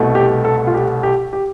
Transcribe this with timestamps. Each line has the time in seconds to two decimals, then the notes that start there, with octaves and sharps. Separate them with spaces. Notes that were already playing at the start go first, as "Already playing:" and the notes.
Already playing: C2 B2 A3
0.15 G4
0.45 A4
0.67 F4
0.74 G4
1.03 G4
1.33 G4